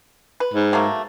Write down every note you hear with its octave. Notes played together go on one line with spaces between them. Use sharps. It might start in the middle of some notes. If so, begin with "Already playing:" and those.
B4
G#2
F#3 A3 A#3